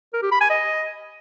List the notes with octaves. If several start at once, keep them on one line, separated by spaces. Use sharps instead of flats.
A#4
G4
B5
G#5
D#5